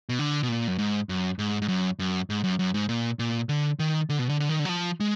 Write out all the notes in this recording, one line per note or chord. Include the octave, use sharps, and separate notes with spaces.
B2
D3
B2
A#2
F#2
G#2
F#2
G#2
G#2
F#2
F#2
G#2
F#2
F#2
G#2
A#2
A#2
D3
D#3
D3
B2
D3
D3
D#3
D3
F#3
F3
G#3